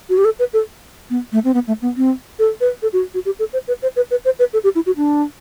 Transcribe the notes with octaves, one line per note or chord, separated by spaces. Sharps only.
F#4
G4
A4
B4
A4
B3
A3
C4
B3
A3
B3
C4
A4
B4
A4
F#4
F#4
G4
A4
C5
B4
C5
B4
B4
C5
B4
A4
G4
E4
F#4
D4